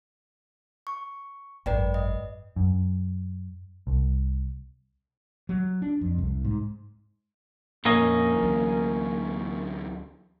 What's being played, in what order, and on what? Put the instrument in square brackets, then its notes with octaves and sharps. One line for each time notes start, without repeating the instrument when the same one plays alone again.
[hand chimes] C#6
[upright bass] G#1 F#2 [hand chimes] B4 D5 G5
[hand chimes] D#5
[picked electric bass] F#2
C2
[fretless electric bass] F#3
D4
F2
C2
G#2
[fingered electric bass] F2 A#2 [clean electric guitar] A#3 C#4 D#5
[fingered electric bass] D2 E3 F#3